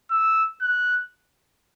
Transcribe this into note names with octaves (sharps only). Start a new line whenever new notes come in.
E6
F#6